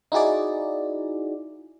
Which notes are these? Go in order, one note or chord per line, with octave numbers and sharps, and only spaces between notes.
D#4 E4 F#4 G#4 D5